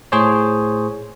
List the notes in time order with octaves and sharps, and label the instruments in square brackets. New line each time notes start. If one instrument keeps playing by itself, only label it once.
[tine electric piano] A2 G#4 C5 C#5